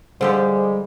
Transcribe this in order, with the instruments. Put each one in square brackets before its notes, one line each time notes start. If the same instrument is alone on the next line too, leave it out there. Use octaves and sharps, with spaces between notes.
[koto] D3 F3 G4 [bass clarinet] G3 [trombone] G#3 [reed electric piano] C5